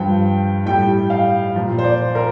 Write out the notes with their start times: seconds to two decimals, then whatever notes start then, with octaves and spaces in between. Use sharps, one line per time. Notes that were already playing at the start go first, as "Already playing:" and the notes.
Already playing: G2 F3 G5
0.66 A2 G3 G5
1.10 F5
1.55 A#2 F3
1.78 C5
1.84 D5
2.15 A#4